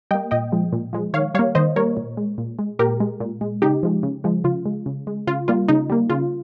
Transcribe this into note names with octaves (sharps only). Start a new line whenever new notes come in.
G3 A#3 D#5 G5
A#2 D#5 G5
F3 G#3
A#2
F3 G#3
D#3 C#5 F5
G3 A#3 C#5 F5
D#3 C5 D#5
G3 A#3 A#4 C#5
A#2
G#3
A#2
G#3
A#2 G4 A#4
G#3
A#2
G#3
C#3 D#4 G4
F3 G#3
C#3
F3 G#3
C#3 F4
G#3
C#3
G#3
C#3 F4
G3 A#3 F4
C#3 D#4
G3 A#3
C#3 F4